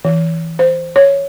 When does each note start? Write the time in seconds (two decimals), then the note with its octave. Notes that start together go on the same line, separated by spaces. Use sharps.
0.05 E3
0.59 C5
0.96 C#5